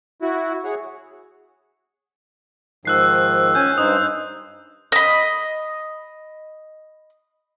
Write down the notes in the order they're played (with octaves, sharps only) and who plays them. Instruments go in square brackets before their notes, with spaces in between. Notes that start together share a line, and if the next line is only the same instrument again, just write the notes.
[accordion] E4 F#4
G#4 C#5 F#5
[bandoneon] G#2 D#3 F3 [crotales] E6 F#6 C7
[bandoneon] C#4 G#5 [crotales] G6
[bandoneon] G2 D#4 C5 [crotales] D#6
[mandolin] D#5 B5